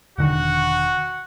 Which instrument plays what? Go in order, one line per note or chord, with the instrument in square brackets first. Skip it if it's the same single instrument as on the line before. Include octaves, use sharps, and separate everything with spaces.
[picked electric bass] E1 D3 D#3 [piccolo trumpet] F#4 [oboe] F#5